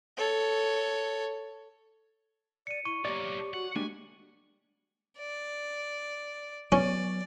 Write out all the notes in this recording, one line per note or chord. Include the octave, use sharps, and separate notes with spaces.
A4 C#5
D5 C#7 D#7
E4 C#6 D#7
B1 A#3 G4 C#5 D5
F#4 F#5
G3 G#3 A#3 D4 G#5
D5
F#3 B3 C#4 D5